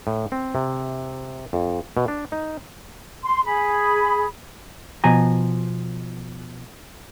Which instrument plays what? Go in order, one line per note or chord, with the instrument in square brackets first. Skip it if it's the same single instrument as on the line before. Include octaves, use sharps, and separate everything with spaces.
[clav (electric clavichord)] A2
C4
C3
F2
B2
D4
D#4
[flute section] C6
G#4 B5
[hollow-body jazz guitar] B2 F3 G#5 A#5